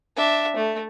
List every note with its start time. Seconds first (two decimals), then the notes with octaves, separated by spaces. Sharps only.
0.16 D4 E5
0.56 A3